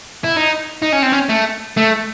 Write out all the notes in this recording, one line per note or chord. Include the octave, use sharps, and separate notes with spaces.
E4
D#4
D#4
C#4
C4
C#4
A3
A3